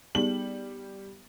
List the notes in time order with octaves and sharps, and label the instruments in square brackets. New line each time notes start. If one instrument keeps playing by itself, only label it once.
[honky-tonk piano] G3 F#7 [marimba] B3 D#4 G#4